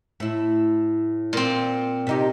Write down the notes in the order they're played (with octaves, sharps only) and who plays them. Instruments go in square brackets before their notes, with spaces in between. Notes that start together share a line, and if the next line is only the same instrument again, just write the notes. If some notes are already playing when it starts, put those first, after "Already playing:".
[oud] A2 E4
[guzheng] A#2 C4
[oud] C3 D#4 G4